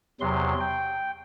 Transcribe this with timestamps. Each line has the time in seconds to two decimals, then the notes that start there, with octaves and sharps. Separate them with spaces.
0.21 E2 C3 F#3 C6
0.60 G5